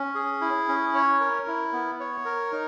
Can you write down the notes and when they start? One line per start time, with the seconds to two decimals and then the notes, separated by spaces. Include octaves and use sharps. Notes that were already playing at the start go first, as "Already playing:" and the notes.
Already playing: C#4
0.15 G#4
0.41 E4
0.68 C#4
0.95 C#5
1.20 A#4
1.47 E4
1.73 B3
2.00 C#5
2.25 A#4
2.52 D#4